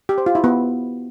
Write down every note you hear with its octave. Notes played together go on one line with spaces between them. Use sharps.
G4
C5
F4
E4
B3